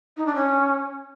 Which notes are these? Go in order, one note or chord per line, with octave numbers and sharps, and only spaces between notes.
D#4
D4
C#4